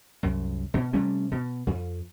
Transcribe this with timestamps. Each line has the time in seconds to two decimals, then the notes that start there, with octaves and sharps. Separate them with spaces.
0.23 C2 F#2
0.74 B2
0.93 C3 G3 A3 C#4
1.31 B2
1.67 F2